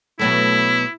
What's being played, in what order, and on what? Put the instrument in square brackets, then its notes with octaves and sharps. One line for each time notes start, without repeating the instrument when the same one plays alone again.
[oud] B2 F#3 A3 [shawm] E4